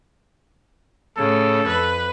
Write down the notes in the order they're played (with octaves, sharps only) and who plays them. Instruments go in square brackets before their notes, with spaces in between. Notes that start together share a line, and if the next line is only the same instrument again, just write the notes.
[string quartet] A2 C#3 [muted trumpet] A4
[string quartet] F2 B4